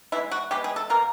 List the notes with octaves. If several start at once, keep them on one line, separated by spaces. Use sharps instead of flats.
E3 G#3 B3 E4
F#4
E3 G#3 B3 G4
G#4
A4
B2 G3 A#3 A#4